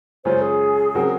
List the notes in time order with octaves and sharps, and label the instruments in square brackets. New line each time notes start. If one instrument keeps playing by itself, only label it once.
[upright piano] F#2 C#3 G#3 C#4 F4 [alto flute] C5
[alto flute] G#4
[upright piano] C#3 F#3 C4 F#4 A#4